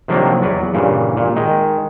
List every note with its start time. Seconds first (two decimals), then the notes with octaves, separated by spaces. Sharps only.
0.08 C3 D#3 F3 F#3 A#3 D4
0.41 E2 F#3 B4 D5
0.74 G2 A#2 C#3 E3
1.17 A#2
1.36 D#3 G#3